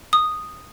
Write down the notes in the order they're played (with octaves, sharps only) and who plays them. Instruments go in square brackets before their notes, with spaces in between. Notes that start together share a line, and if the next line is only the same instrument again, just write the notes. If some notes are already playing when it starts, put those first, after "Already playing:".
[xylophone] D#6